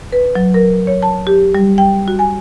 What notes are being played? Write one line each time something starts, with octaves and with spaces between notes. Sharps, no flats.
B4
F#3
A#4
C#5
A5
G4
G3
G5
F#4
G#5